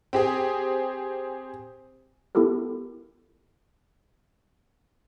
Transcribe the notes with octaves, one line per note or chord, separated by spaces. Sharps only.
C4 G4 G#4
B3 E4 F4 G4 A4 A#4